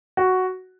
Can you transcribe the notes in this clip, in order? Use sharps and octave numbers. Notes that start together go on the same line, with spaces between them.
F#4